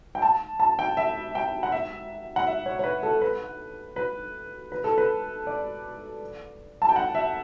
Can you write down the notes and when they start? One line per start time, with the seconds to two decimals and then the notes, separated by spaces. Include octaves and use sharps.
0.15 G5
0.22 A5
0.60 A5
0.79 G5
0.97 E5
1.35 G5
1.63 F#5
1.72 E5
2.36 F#5
2.47 E5
2.66 C#5
2.79 C#5
2.84 B4
3.03 A4
3.22 B4
3.96 B4
4.72 B4
4.84 A4
4.98 B4
5.47 D5
6.82 A5
6.89 G5
6.96 F#5
7.15 E5